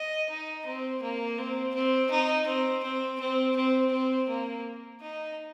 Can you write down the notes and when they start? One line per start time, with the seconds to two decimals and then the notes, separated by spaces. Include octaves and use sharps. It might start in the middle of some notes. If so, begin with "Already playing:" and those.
Already playing: D#5
0.29 D#4
0.66 C4
1.02 A#3
1.38 C4
1.74 C4
2.11 D#4
2.47 C4
2.83 C4
3.20 C4
3.56 C4
3.92 C4
4.29 A#3
5.01 D#4